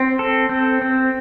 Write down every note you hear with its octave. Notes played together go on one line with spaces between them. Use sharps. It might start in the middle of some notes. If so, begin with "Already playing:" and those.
Already playing: C4
A4
C4
C4